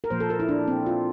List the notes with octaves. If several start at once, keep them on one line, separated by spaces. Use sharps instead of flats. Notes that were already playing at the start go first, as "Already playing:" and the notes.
A#4
A#2 F3 A#3 C5
A4
A#4
E4
D4
C4
F4